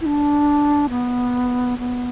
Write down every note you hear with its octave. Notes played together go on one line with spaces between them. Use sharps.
E4
D4
B3
B3